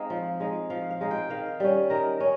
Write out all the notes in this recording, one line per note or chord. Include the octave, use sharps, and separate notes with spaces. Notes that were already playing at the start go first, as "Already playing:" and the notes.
Already playing: G#3 C4 D#4 F5
F3
G#3 D#4
F3 F5
F5
G#3 D#4
G5
D#3 F5
G3 C#4
D#3 A#4
C#4